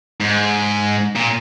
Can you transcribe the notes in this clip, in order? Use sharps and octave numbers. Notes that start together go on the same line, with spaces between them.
G#2
A#2